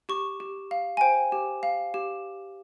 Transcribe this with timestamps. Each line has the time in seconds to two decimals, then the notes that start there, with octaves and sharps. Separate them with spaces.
0.09 G4 C#6
0.40 G4
0.71 F5
0.97 G#5
1.01 C5 G5
1.32 G4
1.63 F5
1.94 G4